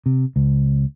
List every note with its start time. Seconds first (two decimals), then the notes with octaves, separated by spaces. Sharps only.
0.06 C3
0.36 C#2